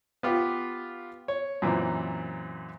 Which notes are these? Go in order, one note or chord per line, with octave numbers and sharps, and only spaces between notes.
B3 F4 G4
C#5
F#2 A#2 E3 C4